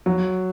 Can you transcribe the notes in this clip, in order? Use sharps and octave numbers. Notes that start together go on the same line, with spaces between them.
F#3